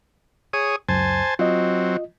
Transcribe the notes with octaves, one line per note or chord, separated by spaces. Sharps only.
G#4 C#5 D#6
C#2 F#2 C5 G#5 A5
F#3 C4 F4 D#5